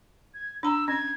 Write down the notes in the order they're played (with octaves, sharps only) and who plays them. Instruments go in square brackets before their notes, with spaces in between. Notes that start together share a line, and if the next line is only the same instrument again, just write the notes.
[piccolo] G#6
[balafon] D4 A#5 [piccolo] E6
[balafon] C#4 [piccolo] G#6